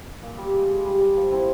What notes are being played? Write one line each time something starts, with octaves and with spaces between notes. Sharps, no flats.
A#2
G3
G#3
G#3
G3
G3
F3
C4 E4